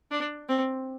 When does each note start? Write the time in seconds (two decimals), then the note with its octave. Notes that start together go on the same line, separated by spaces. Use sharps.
0.11 D4
0.49 C4